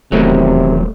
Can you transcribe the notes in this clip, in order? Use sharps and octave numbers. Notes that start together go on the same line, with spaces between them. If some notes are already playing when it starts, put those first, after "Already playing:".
D#1 E2 C3 D#3 F#3 A3